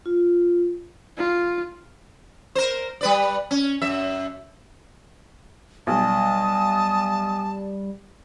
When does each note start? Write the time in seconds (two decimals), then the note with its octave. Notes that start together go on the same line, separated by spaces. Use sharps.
0.06 F4
1.17 F4
2.55 A#4 C5
3.01 G3 B4 D5
3.51 C#4
3.82 F#2 E5
5.87 B1 G3 A5 D#6